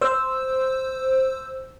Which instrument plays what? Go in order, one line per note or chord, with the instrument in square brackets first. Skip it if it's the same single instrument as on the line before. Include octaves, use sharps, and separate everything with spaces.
[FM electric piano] C5 E6